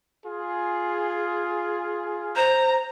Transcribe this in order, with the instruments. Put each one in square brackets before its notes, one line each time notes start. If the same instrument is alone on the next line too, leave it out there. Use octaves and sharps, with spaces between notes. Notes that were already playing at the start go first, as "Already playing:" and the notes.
[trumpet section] F4 G#4
[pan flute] C5 [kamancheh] A#5